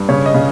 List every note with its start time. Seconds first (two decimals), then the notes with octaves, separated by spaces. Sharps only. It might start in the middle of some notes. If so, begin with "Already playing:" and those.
Already playing: G2
0.09 C#3 C#5
0.26 D#5
0.34 C#3